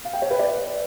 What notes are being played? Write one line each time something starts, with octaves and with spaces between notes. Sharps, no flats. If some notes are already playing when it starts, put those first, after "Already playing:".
F5
G5
C#5
B4
D5